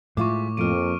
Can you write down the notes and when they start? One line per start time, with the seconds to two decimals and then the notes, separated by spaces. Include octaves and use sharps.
0.17 A2 G#3 F4 E5 C#6 D6
0.57 F2 F3 A#3 F6 D7 D#7